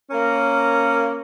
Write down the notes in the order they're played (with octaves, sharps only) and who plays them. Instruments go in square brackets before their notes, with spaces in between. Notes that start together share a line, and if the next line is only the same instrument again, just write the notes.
[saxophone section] A#3 C#4 A#4